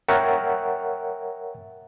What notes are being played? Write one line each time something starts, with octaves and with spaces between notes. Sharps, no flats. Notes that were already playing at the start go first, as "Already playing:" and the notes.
A#4 C#5 E5 F#5 G5